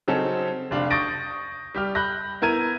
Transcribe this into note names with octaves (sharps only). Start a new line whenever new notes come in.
C#3 F#3 C4 C#4 D#4 A4
F1 D4 F5
C#6 D#6 G6 A6 A#6 D7
G3 G4 F6
B5 F#6 G6 A#6
B3 E4 A#4 G#6 D#7